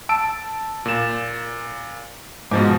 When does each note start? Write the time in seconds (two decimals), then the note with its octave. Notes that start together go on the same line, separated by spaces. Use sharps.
0.09 A5 E6 D7
0.86 A#2 E7
2.51 G#2 B2 F3 D6